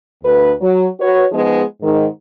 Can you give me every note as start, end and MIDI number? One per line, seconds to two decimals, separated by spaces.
0.24 0.51 38
0.24 0.51 71
0.61 0.87 54
1.00 1.25 66
1.00 1.25 71
1.00 1.25 73
1.31 1.62 53
1.31 1.62 56
1.31 1.62 59
1.31 1.62 63
1.31 1.62 68
1.82 2.05 44
1.82 2.05 51